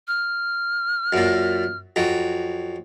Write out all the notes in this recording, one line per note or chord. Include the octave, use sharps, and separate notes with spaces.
F6
F#2 A#2
F2 F#3